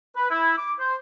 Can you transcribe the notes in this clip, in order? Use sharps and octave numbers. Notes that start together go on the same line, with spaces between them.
B4
E4
D6
C5